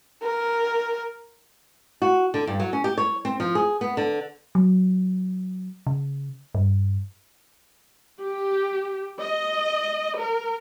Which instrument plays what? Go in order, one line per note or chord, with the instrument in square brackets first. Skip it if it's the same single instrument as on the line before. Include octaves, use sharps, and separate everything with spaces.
[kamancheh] A#4
[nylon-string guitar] F#4
D3
G2
F#3
C#4
G4
C#5
C4
F3
G#4
B3
D3
[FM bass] F#3
C#3
G2
[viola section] G4
D#5
A#4